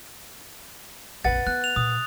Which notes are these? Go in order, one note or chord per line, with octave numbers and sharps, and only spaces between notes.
A#1 F2 B4 F#5 A6
B3 F#6
F7
A#2 D#6